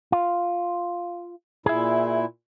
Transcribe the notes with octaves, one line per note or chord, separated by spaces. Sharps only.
F4
A#2 E4 G#4 E5